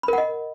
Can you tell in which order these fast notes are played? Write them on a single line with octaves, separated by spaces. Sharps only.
B5 A#4 F#5 D#5